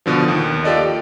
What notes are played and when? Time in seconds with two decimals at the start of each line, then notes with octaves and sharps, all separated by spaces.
0.06 B2 D3 F3
0.28 D#2
0.64 F4 G4 A4 D5 D#5
0.77 D7